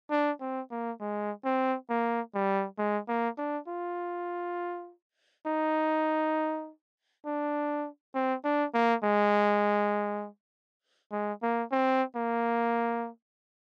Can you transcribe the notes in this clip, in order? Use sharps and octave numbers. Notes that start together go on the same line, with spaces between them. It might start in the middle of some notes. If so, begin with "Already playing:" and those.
D4
C4
A#3
G#3
C4
A#3
G3
G#3
A#3
D4
F4
D#4
D4
C4
D4
A#3
G#3
G#3
A#3
C4
A#3